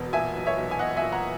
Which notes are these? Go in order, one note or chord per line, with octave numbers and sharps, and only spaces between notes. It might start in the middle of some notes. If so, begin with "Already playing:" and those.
Already playing: E1 B2
A#2 E5 G#5
B1
C#5 E5
B1
G#5
B1 D#5 F#5
E5 G#5
A#2
F#5 A#5